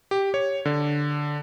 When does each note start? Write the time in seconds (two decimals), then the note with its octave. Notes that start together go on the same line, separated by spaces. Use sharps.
0.11 G4
0.34 C#5
0.65 D3